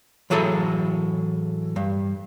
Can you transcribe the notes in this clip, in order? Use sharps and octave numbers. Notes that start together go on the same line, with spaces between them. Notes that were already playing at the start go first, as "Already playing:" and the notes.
A2 E3 F#3 G#4 A4 B5
G2